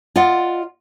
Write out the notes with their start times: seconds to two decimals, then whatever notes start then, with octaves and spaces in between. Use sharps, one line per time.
0.16 F4 D5 D#5 F#5